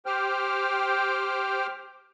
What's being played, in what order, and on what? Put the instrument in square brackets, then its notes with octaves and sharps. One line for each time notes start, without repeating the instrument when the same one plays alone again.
[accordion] G4 C5 G5 F6